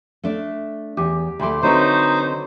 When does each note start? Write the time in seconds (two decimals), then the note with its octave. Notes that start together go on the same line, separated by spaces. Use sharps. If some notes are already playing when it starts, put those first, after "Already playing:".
0.24 A3 D4
0.97 E2 G4
1.39 D2 A3 B5 C6 D6
1.63 D3 F#3 C4 D#4 B4 C5 C#6